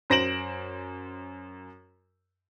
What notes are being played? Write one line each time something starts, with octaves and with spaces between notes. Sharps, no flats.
F#2 C5 A#6 D7 E7 F#7